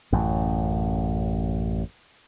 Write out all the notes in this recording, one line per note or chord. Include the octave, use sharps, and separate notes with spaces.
A1 F#2